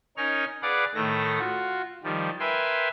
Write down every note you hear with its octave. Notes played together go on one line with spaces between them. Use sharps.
C#4 D#4 A#4 C#5 F6
G#4 B4 D5 F5 F#5 D6
A2 D#3 A3 A#6
F4 F#4
D#3 F3 G3
A#4 B4 E5 G5 G#5 C6